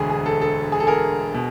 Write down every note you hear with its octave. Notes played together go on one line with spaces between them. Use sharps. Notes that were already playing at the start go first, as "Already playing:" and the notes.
Already playing: E1 D2 D3 G#4
G#4
A4
A4
G#4
A4
G#4 A#4
B2